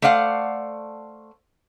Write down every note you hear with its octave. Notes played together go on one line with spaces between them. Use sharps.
A3 C5 D5 F5 F#5